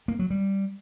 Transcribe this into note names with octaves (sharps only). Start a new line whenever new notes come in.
A#3
F#3
G3